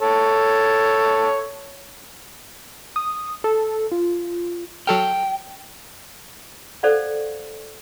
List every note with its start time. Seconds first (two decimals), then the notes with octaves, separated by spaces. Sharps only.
0.01 A4 C#5
2.96 D#6
3.44 A4
3.92 F4
4.87 F#3 A4 G5 F6
6.83 A4 C5 D5 F5 F#5